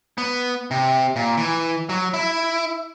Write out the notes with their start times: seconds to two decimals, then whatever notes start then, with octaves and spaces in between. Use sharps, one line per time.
0.18 B3
0.71 C3
1.16 A#2
1.37 E3
1.89 F#3
2.14 E4